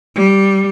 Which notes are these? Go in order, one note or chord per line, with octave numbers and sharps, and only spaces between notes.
G3